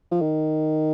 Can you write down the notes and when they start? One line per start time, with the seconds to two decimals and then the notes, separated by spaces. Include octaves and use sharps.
0.11 F3
0.21 D#3